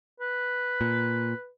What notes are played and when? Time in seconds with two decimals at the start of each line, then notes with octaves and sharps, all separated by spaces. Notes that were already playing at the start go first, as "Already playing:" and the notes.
0.20 B4
0.81 A#2